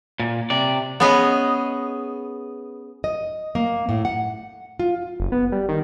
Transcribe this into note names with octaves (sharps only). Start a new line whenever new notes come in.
A#2
C3 D5
B3 C#4 G#4 B4 D#5
D#5
A#3
A2
F#5
F4
F#1
B3
G3
D#3